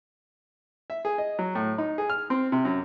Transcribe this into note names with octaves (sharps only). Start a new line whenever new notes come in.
E5
G#4
D#5
F#3
A2
D#4
G#4
F6
C4
C3
F#2